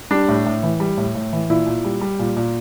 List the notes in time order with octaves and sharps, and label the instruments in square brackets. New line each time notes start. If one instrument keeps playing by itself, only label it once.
[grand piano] G3 D4
A2
A2
E3
G3
A2
A2
E3
A#2 E4
A#2
G3
G3
A#2
A#2